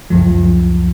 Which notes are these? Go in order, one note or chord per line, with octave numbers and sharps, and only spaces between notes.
C#2 F#2 F3